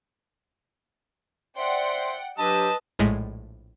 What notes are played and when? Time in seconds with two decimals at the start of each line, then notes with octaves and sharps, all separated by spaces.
1.57 C5 D5 E5 F#5 G5 C6
2.38 F#3 D4 G4 B4 D#5 A5 E6
2.99 A#1 A2 G#3 A#6 B6